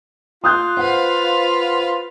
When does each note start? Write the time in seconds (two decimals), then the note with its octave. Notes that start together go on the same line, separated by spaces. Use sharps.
0.44 F4 D#6 F#6 G6
0.77 B4 C5 F5 F#5